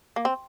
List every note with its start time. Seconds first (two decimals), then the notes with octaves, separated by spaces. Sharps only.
0.16 A#3
0.25 C4